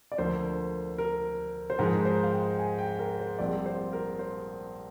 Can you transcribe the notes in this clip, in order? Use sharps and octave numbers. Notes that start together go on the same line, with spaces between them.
D5
D2 D3 F3 A#3 C5
A#4
C5
G#2 F3 G#3 D#4 A#4
C5
F5
G5
G#5
G5
A#4
C5
A#1 A#2 G3 C4 F4 D5
C5
A#4
C5